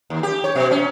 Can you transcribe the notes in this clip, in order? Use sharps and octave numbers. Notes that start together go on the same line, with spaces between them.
D#2
G4
C#5
B2
C#4